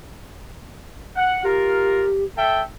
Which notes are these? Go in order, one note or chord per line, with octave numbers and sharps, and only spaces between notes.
F#5
F4 G4 A#4
A4 E5 G5